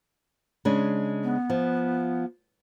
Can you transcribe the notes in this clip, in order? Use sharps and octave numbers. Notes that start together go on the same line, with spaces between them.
C#3 G#3 D4
B3
F3